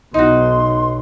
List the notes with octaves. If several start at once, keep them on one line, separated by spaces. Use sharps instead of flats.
B1 D#4 F#4 C6